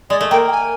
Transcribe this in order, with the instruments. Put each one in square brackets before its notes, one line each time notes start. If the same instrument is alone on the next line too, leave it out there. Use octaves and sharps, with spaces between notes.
[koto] G#3 [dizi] D5
[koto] A3
[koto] A#3 [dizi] G5
[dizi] G5
G#5